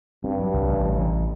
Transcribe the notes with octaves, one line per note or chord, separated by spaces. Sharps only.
G2 C4
F#3
C2
A1
E3
A1